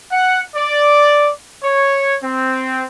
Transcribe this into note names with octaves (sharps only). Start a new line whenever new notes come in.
F#5
D5
C#5
C4